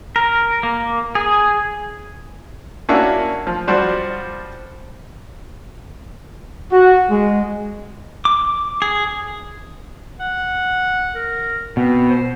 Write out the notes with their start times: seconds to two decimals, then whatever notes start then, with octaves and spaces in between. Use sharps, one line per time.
0.16 A#4
0.63 A#3
1.15 G#4
2.89 A#3 C#4 D4 E4 F#4
3.47 F3
3.67 F3 G3 F#4 C5 D5
6.72 F#4
7.10 G#3
8.25 D6
8.82 G#4
10.20 F#5
11.15 A#4
11.77 B2 C4
12.09 C5